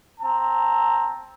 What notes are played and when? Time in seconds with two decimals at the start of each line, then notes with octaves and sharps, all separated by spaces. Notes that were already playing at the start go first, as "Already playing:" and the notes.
0.21 C4 A5 A#5